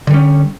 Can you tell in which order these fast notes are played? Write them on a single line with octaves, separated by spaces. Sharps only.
D3 G3 C#4